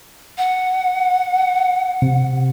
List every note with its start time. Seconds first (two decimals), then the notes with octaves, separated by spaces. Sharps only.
0.38 F#5
2.02 C3